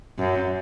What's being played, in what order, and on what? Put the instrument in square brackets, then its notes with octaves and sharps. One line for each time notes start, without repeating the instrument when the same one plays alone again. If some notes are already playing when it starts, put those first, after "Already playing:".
[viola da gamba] F#2